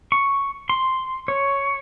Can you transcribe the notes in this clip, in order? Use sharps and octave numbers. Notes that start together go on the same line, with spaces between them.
C#6
C6
C#5